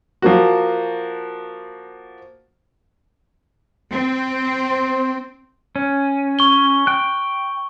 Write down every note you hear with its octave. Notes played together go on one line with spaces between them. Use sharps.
F3 A#3 F#4
C4
C5
C#4
C#6 G7
G5 F#6